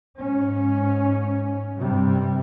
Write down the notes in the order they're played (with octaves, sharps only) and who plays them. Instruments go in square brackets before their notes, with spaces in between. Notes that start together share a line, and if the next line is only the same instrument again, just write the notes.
[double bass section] G#2 C#4
G2 C3 G3